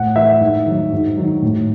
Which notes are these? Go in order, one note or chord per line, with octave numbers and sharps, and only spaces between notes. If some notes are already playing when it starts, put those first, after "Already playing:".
Already playing: A2 F#5
E3 E5
G#2
D#3 F#3
G#2
D#3 F#3
A2